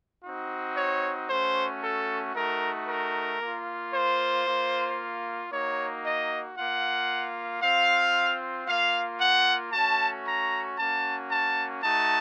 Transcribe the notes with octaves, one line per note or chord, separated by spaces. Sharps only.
C4 D#4 F#4
C#5
A3 C#4 F#4 C5
A4
A3 D#4 F#4 A#4
A#4
A#3 F4
C5
A#3 F4
A#3 D#4 F#4 C#5
D#5
A#3 F4 F#5
C4 F4 F5
A#3 F4 F5
F#5
A3 C#4 F#4 A5
A#5
A#3 C#4 F#4 A5
A5
A3 D#4 F#4 A5